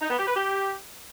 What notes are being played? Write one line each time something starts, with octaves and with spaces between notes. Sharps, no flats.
D#4
B3
G4
B4
G4